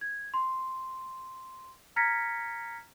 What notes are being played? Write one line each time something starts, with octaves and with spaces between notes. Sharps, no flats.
G#6
C6
A#5 F6 G#6 A#6 B6 C#7